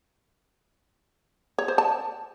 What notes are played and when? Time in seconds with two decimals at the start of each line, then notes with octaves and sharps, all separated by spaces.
1.58 C#5
1.68 C5
1.78 A5